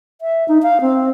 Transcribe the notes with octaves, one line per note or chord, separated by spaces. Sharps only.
E5
D#4
F5
C4